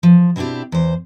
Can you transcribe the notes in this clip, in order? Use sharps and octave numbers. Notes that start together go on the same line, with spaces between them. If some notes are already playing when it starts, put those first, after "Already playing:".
F3
B2 C4 D4 E4 G4
E2 C5